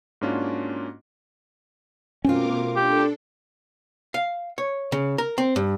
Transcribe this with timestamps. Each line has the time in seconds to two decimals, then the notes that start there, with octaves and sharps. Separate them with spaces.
0.21 G#2 A#3 C#4 D4 F4 F#4
2.24 B2 A3 C4 C#4 F4 A#4 D6
2.76 D4 G4 A4
4.14 F5
4.58 C#5
4.92 C#3
5.18 A#4
5.38 C4
5.56 G2